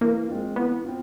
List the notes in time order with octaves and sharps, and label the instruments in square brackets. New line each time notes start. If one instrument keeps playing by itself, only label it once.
[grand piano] E3 [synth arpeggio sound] A#3
[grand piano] G#3 C4 F4
[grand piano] E3 [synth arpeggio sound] B3
[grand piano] C4 F4